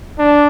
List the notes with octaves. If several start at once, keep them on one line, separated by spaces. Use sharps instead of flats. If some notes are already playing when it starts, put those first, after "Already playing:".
D4